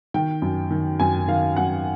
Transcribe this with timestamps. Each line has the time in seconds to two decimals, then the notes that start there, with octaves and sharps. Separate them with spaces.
0.14 D#3 G5
0.42 F#2
0.71 D#3
1.00 F#2 G#5
1.28 D#3 F5
1.56 F#2 F#5